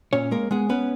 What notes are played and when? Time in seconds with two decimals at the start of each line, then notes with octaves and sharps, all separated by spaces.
0.13 A#2 C#4 C#5
0.31 G#3 A#3 A#4
0.51 G#3 B3 G#4
0.69 B3 C#4 B4